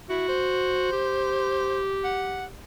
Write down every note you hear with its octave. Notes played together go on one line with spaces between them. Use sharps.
E4 F#4
C5
G4
F#5